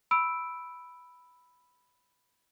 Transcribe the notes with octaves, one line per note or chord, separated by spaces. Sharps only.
B5 E6 D7